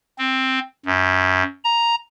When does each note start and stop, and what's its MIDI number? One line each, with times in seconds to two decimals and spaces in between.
0.18 0.59 60
0.86 1.43 42
1.64 1.95 82